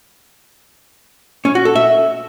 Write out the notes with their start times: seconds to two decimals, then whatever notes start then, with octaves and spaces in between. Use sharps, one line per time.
1.45 C#4
1.55 F#4
1.65 A4
1.76 E5